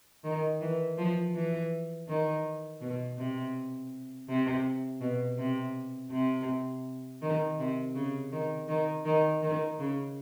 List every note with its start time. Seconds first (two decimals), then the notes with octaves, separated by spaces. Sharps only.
0.24 D#3
0.61 E3
0.98 F3
1.35 E3
2.08 D#3
2.81 B2
3.18 C3
4.29 C3
5.01 B2
5.38 C3
6.11 C3
7.22 D#3
7.59 C3
7.95 C#3
8.32 D#3
8.69 D#3
9.05 D#3
9.42 D#3
9.79 C#3